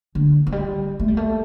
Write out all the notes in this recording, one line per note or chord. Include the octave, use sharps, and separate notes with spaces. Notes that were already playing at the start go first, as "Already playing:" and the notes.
D3
F3
G3
A3
G3
A3